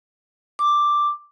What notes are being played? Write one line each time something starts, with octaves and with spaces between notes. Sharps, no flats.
D6